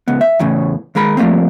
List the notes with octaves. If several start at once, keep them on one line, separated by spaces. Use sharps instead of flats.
C#2 B3
E5
E2 A2 C#3
D#2 G#3 A#4 B5
F3 G3 A3 A#3 C4